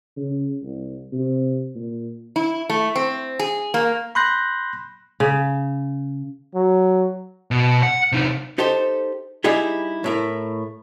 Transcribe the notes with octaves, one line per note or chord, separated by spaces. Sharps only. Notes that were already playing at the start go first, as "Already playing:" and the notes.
C#3
C2
C3
A#2
E4
A3
C4
G#4
A#3
B5 C6 F#6 G6 A#6
C#3
F#3
B2
F#5
C3 D#4
D#4 G4 A4 C5
G3 D#4 E4 G4 G#4
A2 E4 A#4